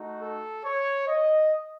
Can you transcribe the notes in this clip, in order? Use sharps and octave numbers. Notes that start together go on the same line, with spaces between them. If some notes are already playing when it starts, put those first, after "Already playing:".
Already playing: A3 D#4 F#4
A4
C#5
D#5